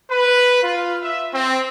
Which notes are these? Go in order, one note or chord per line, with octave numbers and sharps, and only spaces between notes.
B4
F4
E5
C4